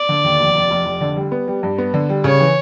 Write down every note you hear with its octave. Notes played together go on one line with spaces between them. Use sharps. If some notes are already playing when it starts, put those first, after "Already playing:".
Already playing: D5
D3
D#2
F1
F1
F1
F1
D3
G3
B3
G3
G2
B3
D3
G3
C#3 C#5
E3